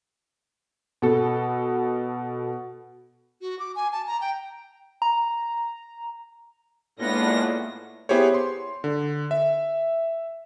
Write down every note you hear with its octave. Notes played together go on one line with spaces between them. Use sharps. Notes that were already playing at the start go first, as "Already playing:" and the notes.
B2 A4
F#4
D6
G#5
A5
A#5
G5
A#5
A2 G#3 A#3 B3 D4 F4 A#6
B3 E4 G4 G#4 C5 C#5
C6
D3
E5